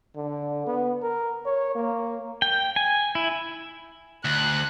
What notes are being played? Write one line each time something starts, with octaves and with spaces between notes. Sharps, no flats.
D3
B3
A#4
C#5
A#3
G5
G#5
E4
D2 F#6